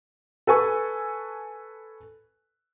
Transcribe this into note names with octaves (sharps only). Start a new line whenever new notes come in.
A4 B4 G#5 C#6